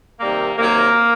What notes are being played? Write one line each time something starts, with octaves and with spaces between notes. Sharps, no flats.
C3 D#3 G3 A#3
C3 D#3 F#3 A#3